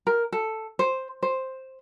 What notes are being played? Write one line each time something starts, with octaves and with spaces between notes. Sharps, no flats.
A#4
A4
C5
C5